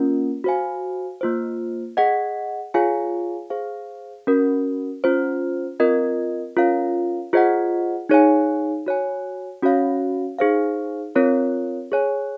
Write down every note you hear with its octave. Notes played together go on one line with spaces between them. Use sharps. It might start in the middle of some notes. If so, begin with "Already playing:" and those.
Already playing: A#3 C#4 F4 A#4
F#4 C5 F5 G#5
A#3 F4 C5
G#4 D#5 F#5
F4 G#4 C#5 F5 G#5
G#4 C5 F5
C#4 F#4 A#4
C#4 F4 C5
C4 F4 A#4 D#5
C#4 F4 A#4 C#5 F5
F4 G#4 C5 D#5 F#5
D#4 G#4 C#5 F5 G#5
F#4 C#5 G#5
C#4 F#4 C#5 F5
D#4 G#4 C5 F5
C4 F4 A#4 C#5
G#4 C#5 G#5